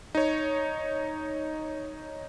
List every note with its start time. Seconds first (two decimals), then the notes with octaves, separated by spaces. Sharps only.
0.15 D#4 C#5